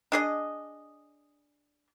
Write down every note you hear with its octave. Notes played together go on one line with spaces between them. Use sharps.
D4 G#4 D#5